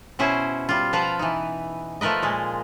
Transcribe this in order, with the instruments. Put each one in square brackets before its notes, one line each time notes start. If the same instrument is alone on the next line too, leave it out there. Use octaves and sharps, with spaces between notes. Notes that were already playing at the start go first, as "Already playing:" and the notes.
[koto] B2 C#4 E4 C5
G3 F4
B2 F3 B4 F5 A5 A#5
E3 D#4
F3 A3 A#4 B4 D#5
A#2 G#3